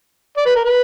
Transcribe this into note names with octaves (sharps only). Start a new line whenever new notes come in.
D5
B4
A#4
B4